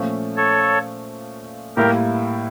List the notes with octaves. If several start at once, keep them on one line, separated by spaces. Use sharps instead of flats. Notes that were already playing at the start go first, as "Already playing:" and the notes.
Already playing: A#2 F3 A3 C#4
A4 C#5
A2 G3 A#3 E4 G4 A#4